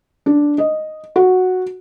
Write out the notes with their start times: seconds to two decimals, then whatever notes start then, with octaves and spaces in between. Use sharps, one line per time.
0.26 D4
0.58 D#5
1.16 F#4